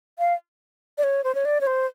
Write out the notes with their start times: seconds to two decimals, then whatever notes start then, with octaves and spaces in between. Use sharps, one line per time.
0.19 F5
0.98 D5
1.03 C#5
1.24 C5
1.35 C#5
1.45 D5
1.61 C#5
1.67 C5